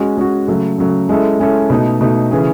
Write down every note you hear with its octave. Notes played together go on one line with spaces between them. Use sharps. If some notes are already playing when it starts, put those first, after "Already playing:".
Already playing: G#3 C#4 F#4
G#3 C#4 F#4
C#3 F#3 A3
C#3 F#3 A3
G#3 C#4 E4 A4
G#3 C#4 E4 A4
B2 A3 D#4
B2 A3 D#4
C#3 E3 A3 C#4 G#4